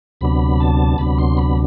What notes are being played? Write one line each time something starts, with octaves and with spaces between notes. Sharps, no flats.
D2 C3 F#3 B3 D4 B5
A5
D2 C3 F#3 B3 D4 B5
C6
B5